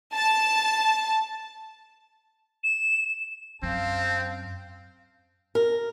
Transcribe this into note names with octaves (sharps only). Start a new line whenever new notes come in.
A5
E7
F#2 C4 F5 A5
A#4